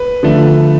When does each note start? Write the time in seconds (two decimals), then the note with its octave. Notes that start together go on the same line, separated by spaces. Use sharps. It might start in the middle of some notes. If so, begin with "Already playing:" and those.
Already playing: B4
0.23 D3 F3 A3